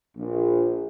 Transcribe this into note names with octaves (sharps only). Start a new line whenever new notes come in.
A#1